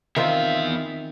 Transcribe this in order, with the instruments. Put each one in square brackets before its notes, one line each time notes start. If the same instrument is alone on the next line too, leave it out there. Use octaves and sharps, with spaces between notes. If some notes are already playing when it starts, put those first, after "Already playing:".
[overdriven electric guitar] E2 E5 [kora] D#3 C4 F4